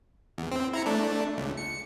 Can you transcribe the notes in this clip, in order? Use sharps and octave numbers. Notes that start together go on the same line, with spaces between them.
E2
C4
E4 A#5 C#7
A3 D4
C#2
C#7